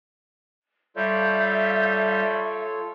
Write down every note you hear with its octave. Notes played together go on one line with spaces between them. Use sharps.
G3 F4 A4 C#5 E5 F5 G6